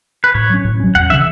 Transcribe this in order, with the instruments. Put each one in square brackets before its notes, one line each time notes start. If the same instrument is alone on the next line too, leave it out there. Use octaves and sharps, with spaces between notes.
[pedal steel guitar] B4
[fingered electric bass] A2 [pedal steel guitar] C#5
[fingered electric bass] F#3 C#4
A2
F#3 C#4
[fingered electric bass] E2 [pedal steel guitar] F#5
[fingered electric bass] C#3 E3 C#4 [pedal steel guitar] E5